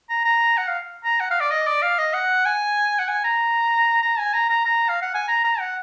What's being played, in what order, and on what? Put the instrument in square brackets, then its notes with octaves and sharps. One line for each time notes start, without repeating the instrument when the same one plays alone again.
[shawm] A#5
A#5
F#5
F5
A#5
F#5
F5
D5
D#5
D5
F5
D#5
F#5
G#5
F#5
G#5
A#5
A#5
G#5
A#5
A#5
A#5
F5
F#5
G#5
A#5
A#5
F#5